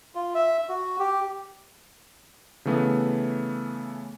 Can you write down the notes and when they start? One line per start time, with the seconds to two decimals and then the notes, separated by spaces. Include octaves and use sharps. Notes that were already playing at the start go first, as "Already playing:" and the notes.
0.15 F4
0.35 E5
0.69 F#4
0.99 G4
2.65 C#3 E3 A3 B3